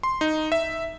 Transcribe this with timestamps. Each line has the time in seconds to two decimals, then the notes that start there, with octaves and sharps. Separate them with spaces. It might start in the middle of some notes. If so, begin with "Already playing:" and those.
0.03 C6
0.21 D#4
0.52 E5